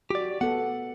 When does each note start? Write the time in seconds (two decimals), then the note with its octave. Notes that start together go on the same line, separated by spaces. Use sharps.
0.10 F#4 G4 D5
0.41 B3 A4 F#5